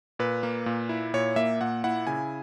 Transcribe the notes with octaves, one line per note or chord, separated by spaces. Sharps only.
A#2 B4
A#3
A#2
E4
A#2 C#5
A#3 E5
A#2 F#5
E4 F#5
C#3 G#5